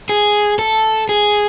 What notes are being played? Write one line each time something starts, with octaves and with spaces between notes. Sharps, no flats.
G#4
A4
G#4